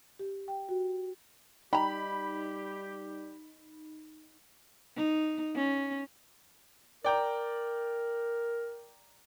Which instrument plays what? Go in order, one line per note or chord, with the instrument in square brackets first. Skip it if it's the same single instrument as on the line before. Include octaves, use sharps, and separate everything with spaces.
[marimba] G4
G5
F#4
[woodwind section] G3 G4 [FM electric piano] D#4 [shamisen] G5 A#5 [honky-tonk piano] B5
[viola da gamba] D#4
C#4
[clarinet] A#4 [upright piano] D5 G5 A#5